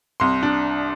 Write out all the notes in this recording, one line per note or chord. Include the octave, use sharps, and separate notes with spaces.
C2 C6
D4